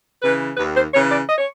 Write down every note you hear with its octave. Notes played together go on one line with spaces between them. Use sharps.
C#3 E3 B4
D#2 B4
C5
C#3 E3 C#5
D5
D#5
C#5